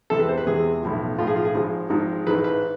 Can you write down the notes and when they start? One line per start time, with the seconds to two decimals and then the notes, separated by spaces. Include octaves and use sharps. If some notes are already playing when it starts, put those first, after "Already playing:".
0.10 E2 C3 E3 G#3 A4
0.20 B4
0.28 C5
0.38 B4
0.46 E2 C3 E3 G#3 G#4
0.82 B1 A2 F3
1.18 B1 A2 F3 F4
1.27 G#4
1.36 F4
1.45 G#4
1.55 G#1 G#2 F3 G#3
1.90 G#1 G#2 F3 G#3
2.26 A1 G#2 E3 G#3 B4
2.44 B4